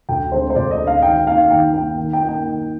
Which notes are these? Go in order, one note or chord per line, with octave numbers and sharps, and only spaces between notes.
D2 G5
D3 G#3 C4 C5
C5
D2 D5
D#5
D3 G#3 C4
F5
D#3 G5
A#3 D#4 F5
D#3 G5
A#3 D#4 G5
D#3
G5
A#3 D#4 A#4 D#5
G5
D#3